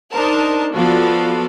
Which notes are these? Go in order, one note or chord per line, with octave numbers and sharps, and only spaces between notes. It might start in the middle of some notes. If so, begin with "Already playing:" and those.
D4 D#4 A#4 C5 A5
F3 B3 F4 F#4 A4 D5